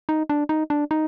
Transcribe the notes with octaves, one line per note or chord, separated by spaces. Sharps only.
D#4
D4
D#4
D4
D#4